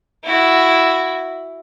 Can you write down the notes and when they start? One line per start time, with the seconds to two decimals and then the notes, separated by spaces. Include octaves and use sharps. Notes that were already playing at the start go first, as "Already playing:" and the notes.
0.24 E4 F#4